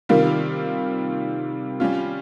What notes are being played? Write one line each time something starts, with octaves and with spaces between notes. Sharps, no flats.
C3 D#3 G3 A#3 F4
G3 C#4 F4